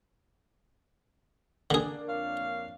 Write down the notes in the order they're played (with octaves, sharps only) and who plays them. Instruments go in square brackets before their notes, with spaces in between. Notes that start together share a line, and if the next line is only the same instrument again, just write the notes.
[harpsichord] D3 G#4 [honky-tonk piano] A#3 D4
[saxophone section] F2 C#5 F5